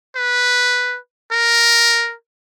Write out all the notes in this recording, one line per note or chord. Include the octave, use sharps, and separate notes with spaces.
B4
A#4